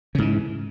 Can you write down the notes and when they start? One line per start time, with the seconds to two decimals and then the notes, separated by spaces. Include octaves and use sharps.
0.15 C#3
0.18 G#2
0.22 E3